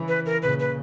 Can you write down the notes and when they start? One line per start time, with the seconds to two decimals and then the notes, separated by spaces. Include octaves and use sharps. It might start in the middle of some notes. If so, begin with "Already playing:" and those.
Already playing: C#3 E3
0.08 B4
0.26 A#4
0.42 A#2 C#3 B4
0.59 B4